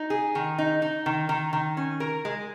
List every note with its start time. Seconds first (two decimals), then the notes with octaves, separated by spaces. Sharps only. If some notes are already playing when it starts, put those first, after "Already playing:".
Already playing: D#4
0.10 G#4
0.35 D#3
0.59 D#4
0.82 D#4
1.06 D#3
1.29 D#3
1.53 D#3
1.77 C#4
2.00 A#4
2.25 G#3